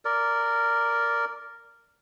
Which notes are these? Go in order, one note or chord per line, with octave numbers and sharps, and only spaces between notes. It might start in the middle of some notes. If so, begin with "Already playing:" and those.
A#4 D5